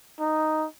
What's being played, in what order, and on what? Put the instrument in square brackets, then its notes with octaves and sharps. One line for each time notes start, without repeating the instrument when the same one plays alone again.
[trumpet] D#4